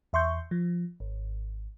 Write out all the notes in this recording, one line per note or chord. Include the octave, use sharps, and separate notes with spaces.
E2 E5 C6 C#6 G6
F3
G#1